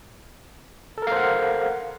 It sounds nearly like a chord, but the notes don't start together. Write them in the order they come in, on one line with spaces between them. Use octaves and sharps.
A4 A#4 F5 C5 F#5